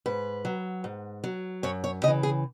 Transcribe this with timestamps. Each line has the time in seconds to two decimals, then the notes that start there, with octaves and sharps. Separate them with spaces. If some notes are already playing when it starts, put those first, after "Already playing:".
0.06 G#2 B4
0.45 F#3
0.84 G#2
1.24 F#3
1.63 F#2 C#5
1.84 C#5
2.03 C#3 D#5
2.08 E3
2.23 G#4